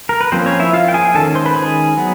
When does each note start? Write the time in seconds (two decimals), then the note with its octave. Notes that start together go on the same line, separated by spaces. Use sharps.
0.09 A#4
0.21 B4
0.32 F3 A#3 C4 C#4 C5
0.46 C#4 C#5
0.59 E4 E5
0.73 F4 F5
0.88 G5
0.94 G#4 G#5
1.15 D#3 G#3 C#4 A4 A5
1.35 C5 C6
1.46 B4 B5
1.56 G#4 G#5
1.97 F#3 B3